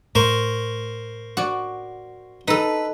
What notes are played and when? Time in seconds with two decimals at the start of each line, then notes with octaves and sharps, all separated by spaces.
0.15 A2 A#4 C5 C#6
1.37 F#4 D5
2.48 D#4 A4 B4